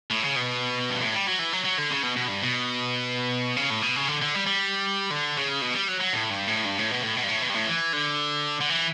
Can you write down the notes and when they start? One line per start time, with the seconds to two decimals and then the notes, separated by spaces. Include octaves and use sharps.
0.11 A2
0.24 C#3
0.37 B2
0.90 G2
1.01 A2
1.13 G3
1.26 F#3
1.39 E3
1.53 F#3
1.65 F#3
1.78 D3
1.91 C#3
2.03 B2
2.17 B2
2.28 G2
2.42 B2
3.56 C#3
3.70 A2
3.82 B2
3.96 C#3
4.08 D3
4.22 D3
4.35 G3
4.46 G3
5.10 D3
5.37 C#3
5.62 B2
5.74 G3
5.88 F#3
6.00 F#3
6.13 A2
6.30 G2
6.47 A2
6.65 G2
6.78 A2
6.91 B2
7.03 A2
7.16 B2
7.23 G2
7.29 A2
7.42 B2
7.49 G2
7.54 A2
7.67 E3
7.93 D3
8.60 D3
8.70 E3